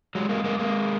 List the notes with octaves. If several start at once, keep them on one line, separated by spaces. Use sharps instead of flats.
F#3 G#3
G#3 A#3
G#3 A#3
G#3 A#3